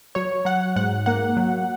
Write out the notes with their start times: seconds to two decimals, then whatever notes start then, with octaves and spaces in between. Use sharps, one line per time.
0.15 F#3 C#5
0.45 F#3 F#5
0.76 G#2 F#5
1.06 A#3 F#5
1.37 F#3